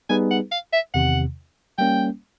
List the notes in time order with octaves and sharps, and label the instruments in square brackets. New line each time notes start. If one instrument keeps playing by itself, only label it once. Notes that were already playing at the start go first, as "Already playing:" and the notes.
[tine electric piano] G3 B3 D#4 G#4 B4 [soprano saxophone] G#5
[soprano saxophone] F#5
F5
E5
[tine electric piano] E2 C3 D#3 [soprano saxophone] F#5
[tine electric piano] G3 A#3 C#4 [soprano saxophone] G5